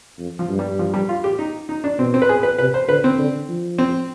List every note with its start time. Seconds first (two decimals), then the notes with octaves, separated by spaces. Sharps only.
0.19 F2
0.39 F3
0.49 G2
0.59 G3
0.79 F3
0.94 G3
1.09 F4
1.24 G4
1.39 D#4
1.69 D#4
1.84 D4
1.99 B2 C4
2.14 C4
2.22 B4
2.29 G#4
2.43 B4
2.58 C3 B4
2.74 C5
2.89 D3 B4
3.04 C4
3.19 D3
3.49 F3
3.78 C4